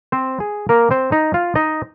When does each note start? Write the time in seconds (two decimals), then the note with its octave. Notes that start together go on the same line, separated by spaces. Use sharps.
0.12 C4 C5
0.40 G#4
0.69 A#3 A#4
0.91 C4 C5
1.12 D#4 D#5
1.34 F4 F5
1.55 D#4 D#5